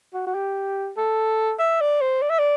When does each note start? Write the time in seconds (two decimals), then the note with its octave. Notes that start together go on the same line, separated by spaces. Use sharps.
0.14 F#4
0.27 F#4
0.34 G4
0.97 A4
1.59 E5
1.81 D5
2.01 C5
2.22 D5
2.30 E5
2.39 D5